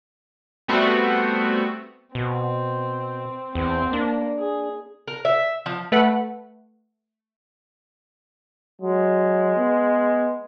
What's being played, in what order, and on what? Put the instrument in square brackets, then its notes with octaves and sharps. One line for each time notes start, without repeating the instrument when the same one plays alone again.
[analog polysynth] G3 A3 B3 C4 F#4
[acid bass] B2 [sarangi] C4
[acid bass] E2 [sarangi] C4
[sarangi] A#3 [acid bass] D4
[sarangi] G#4
[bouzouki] A#4
E5
F3
[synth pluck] A3 B4 F#5
[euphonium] F#3 [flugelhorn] G#3
[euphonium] B3